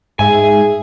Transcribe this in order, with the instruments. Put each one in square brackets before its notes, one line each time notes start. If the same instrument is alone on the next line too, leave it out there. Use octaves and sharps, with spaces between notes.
[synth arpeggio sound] G#2 E5 [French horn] G#4 [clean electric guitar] G#5